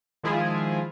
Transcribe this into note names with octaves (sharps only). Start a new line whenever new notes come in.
D#3 F3 G#3 E4 F4 G#4